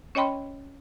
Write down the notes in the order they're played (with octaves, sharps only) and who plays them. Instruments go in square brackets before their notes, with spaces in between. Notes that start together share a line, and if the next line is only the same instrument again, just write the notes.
[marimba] C#4 C#5 D#5 G5 B5 C6